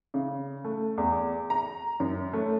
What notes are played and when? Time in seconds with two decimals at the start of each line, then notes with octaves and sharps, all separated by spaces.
0.14 C#3
0.64 A3
0.98 E2
1.50 A#5
2.00 F#2
2.33 A3